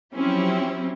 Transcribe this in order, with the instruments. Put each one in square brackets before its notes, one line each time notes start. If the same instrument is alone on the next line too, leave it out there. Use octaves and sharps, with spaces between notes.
[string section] F3 F#3 C4 C#4 E4 G4